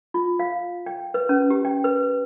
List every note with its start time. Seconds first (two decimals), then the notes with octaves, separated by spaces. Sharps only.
0.14 F4
0.40 F5
0.86 G5
1.14 B4
1.29 C#4
1.50 G4
1.65 G5
1.84 B4